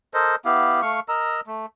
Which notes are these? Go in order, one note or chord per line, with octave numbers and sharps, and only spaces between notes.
A4 A#4 C5 D#5
B3 E4 G4 F5
A3 F5 C#6
A#4 D#5 A#5 E6
A3